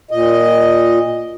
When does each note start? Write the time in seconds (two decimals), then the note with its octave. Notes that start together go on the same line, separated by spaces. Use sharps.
0.11 A#2 D#5